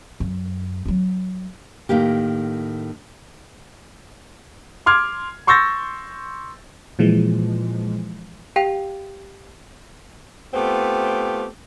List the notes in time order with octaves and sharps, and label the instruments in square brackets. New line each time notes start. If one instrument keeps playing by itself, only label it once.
[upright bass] F#2
F#3 D#4
[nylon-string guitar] A2 D#3 A#3 G4
[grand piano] C6 D6 F6 G#6
C6 C#6 E6 G6 A6 A#6
[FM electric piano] A#2 E3 F3 G#3
[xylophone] G4 F5 G5 F7
[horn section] A3 B3 C4 F4 G4